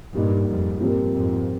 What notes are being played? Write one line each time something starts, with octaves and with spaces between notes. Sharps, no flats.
G2 A#2 G3 A#3 D#4
F2 G#2
G2 A#2 F3 C4 G4 A#4
F2 G#2